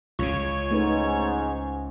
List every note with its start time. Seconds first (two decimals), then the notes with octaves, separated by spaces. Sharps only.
0.19 C#2 C#3 F4 C#5
0.71 G#2 A3 D#4 B4
1.05 G#5